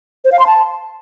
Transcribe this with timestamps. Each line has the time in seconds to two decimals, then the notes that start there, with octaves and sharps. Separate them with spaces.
0.25 C5
0.32 F5
0.39 C6
0.47 A5